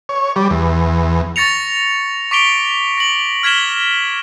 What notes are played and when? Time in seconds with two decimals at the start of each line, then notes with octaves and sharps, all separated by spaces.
0.09 C#5
0.36 G3
0.50 E2
1.36 C#6 A6 A#6 C#7 F7
2.31 C#6 D6 B6 D7 F7 G7
2.98 A#6 F#7
3.43 F6 G#6 B6 E7 G7